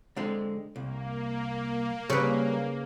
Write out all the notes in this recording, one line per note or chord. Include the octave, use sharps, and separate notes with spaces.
D3 G#3 C4
C2 A#3
C#3 G3 C4 B4